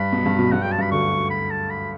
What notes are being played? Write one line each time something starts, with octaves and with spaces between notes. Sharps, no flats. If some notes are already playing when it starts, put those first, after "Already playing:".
Already playing: G2 B5
B1 B2
G2
B1 B2
G2 F#5
F#2 G5
A5
G2 B5
D2 D3 C#6
B5
A5
B5